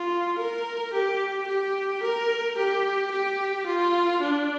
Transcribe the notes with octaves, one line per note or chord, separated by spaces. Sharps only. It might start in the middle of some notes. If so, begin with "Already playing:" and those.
Already playing: F4
A#4
G4
G4
A#4
G4
G4
F4
D4